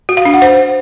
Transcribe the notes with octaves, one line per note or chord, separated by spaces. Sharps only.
F#4
F5
D4
F#5
C5